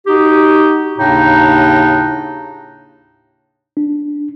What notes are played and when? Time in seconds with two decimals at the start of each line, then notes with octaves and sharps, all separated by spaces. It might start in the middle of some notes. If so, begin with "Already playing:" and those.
0.06 D#4 F#4 G4
0.97 D#2 A2 C#3 D4 D#4
3.77 D4